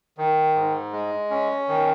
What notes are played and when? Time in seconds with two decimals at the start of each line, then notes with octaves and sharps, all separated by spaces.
0.18 D#3
0.55 G#2
0.93 G#3
1.30 C#4
1.68 D#3